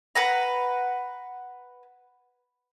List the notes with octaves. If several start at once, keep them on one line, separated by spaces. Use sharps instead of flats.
B4 F#5 A#5